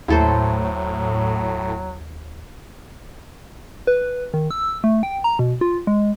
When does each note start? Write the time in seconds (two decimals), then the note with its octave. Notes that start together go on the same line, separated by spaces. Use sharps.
0.08 D#2 A2 F#3 E4 A4 C5
3.87 B4
4.34 D#3
4.51 E6
4.84 A3
5.03 G5
5.24 A#5
5.39 B2
5.61 F4
5.87 G#3